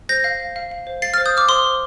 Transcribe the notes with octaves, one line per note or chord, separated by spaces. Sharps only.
C5 G6 A#6
F5
F5
F5
F5
C5
F5 A6 C7
F6 A6
C5
D#6 G6
C5 D6 F6
C5 C6 D#6
C5